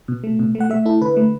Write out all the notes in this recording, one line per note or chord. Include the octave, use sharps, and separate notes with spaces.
B2
A3
B2
A3
F#5
A3 E5
E4 A4
D3 B4
A3